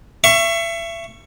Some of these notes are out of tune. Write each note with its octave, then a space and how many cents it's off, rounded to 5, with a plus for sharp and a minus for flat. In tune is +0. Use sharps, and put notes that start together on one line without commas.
E5 +30 C#6 +0